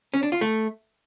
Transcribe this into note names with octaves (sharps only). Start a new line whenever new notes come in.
C#4
D4
F4
A3